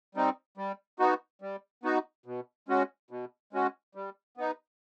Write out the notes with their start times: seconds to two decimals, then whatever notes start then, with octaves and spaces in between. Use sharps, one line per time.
0.15 G3 C4 D#4
0.57 G3
0.99 B3 D#4 F#4
1.42 G3
1.83 B3 D#4 F#4
2.26 B2
2.68 G#3 C#4 F#4
3.10 B2
3.53 G#3 C#4 F#4
3.95 G3
4.37 B3 D#4